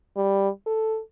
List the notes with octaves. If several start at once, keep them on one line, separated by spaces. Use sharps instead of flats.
G3
A4